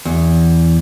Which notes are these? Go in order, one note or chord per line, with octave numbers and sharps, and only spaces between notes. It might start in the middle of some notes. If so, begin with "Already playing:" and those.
E2